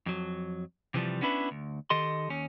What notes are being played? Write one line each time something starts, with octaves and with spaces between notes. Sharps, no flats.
F2 F#3
C3 E3 F3 G3
B3 C#4 D4 E4 B4
D2
D#3 G4 A4 D#5 C6
D#2 C#4